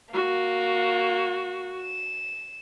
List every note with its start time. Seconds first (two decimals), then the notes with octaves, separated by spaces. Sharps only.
0.13 A#3 F#4
1.82 E7